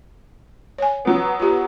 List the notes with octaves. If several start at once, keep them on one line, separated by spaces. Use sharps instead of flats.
C#5 G#5
F#3 B3
F4 G4